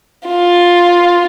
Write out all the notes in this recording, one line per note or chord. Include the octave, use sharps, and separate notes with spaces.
F4